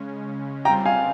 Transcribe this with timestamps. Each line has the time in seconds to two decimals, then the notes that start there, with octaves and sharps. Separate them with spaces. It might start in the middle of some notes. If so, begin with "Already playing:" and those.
Already playing: C#3 G#3 C#4
0.65 C#3 G3 C4 F4 G5 A#5
0.85 F5 G#5